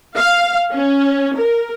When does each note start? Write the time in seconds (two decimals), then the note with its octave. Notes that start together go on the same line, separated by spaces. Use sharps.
0.16 F5
0.75 C#4
1.37 A#4